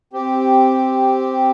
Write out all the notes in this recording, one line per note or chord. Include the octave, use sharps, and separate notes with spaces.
C4 G4